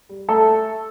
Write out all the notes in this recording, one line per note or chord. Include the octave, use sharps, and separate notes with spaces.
G3
A3 A4